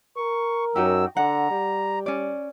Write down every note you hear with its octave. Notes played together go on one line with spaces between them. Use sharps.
A#4 C#6
F#2 F#3 D#4 F#4 G4 E6
D3 F#5 A#5
G3
C#4 D5